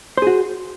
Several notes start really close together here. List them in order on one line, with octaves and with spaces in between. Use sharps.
C5 G#4 F#4